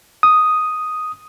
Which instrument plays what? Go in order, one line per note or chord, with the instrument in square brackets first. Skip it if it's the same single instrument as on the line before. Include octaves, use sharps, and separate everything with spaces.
[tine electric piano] D#6